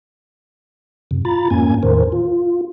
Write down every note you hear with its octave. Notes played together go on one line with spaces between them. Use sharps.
F#2 C3
F4 A#5 B5 A6
F2 G#2 A#3 C#4 G#5 G#6
E2 A2 D#3 A#4 C5
F4